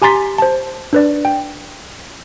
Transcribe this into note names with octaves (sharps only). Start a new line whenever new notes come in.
G4 G#5 A#5 C6 A6 B6
C5 A5
D4 B4 D5
G5